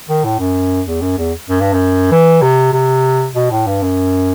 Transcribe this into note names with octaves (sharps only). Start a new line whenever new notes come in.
D#3
A2
F#2
E2
F#2
E2
F#2
G2
F#2
E3
C3
C3
B2
A2
G2
F#2